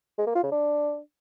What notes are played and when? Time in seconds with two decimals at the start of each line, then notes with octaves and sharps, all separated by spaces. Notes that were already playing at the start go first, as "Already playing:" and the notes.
0.19 G#3
0.27 A#3
0.35 F4
0.43 C#3
0.52 D4